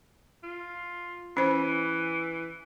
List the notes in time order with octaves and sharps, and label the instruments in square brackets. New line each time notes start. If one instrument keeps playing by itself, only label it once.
[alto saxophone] F4
[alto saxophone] E3 [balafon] C#4 C5